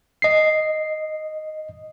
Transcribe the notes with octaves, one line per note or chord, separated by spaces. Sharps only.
D#5 C7